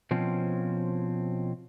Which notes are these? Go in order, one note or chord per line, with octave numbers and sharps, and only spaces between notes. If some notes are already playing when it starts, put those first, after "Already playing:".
B2 F3 C4 C#4